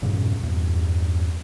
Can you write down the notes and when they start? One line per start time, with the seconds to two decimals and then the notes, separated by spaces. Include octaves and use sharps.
0.02 E1 G2 A#2 C#3
0.43 E2 G2